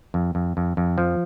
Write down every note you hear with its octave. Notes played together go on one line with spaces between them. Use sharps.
F2
F2
F2
F2
F3